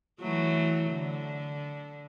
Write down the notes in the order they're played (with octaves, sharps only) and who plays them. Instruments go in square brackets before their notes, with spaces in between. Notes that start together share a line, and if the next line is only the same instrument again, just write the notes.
[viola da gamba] E3 F#3 A3
D3